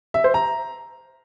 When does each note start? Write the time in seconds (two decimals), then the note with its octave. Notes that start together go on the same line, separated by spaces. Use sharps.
0.14 E5
0.24 C5
0.34 A#5